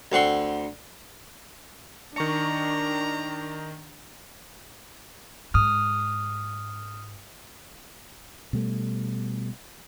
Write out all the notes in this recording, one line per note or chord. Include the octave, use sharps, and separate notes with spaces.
D2 C4 F#5 C6
D#3 D4 A#5 C#6 C#7
G#2 D#6 F6
B2 G3 A3